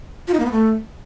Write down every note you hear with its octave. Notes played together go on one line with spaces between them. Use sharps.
F4
D#4
A#3
B3
A3